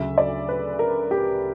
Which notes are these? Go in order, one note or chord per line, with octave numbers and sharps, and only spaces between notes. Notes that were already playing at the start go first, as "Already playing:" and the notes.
Already playing: D2 C#3 F#3 E5
D5
B4
A#4
G4